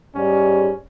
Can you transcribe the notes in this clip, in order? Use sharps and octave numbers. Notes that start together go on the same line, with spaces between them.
G#2 G3 C#4